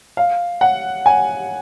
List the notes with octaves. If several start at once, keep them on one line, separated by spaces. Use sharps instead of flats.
F5
F#5
G#5